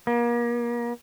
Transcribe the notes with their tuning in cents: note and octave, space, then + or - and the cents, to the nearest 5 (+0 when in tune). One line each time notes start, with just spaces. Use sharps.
A#3 +35